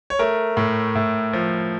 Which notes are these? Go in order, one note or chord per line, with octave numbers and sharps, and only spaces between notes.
C#5
A3 A#4
A2
A2
F3